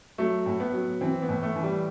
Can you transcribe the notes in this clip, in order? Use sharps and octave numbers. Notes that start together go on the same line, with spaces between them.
F#3 A3
A2
B3
F#3
E3 C4
B3
A2
A3
E3
G3